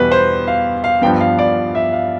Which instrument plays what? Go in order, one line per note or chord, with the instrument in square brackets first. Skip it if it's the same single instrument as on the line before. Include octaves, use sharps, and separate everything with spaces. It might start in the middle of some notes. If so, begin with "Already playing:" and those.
Already playing: [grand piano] E2 B2 G3 B3 B4
C5
F5
F5
G2 F3 B3 G5
F5
D5
E5
F5